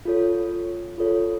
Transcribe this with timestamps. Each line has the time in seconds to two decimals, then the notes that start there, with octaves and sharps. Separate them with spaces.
0.05 F4 A4 C#5
0.98 F4 A4 C#5